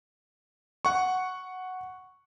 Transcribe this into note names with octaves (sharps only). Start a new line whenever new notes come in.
F#5 C#6